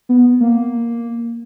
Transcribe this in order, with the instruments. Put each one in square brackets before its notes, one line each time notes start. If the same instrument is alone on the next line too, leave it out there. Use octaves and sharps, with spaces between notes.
[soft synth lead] B3
A#3